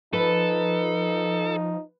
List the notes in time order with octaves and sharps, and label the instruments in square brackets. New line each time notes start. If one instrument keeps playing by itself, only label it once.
[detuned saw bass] F3 [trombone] D#4 [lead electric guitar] A4 [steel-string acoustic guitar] B4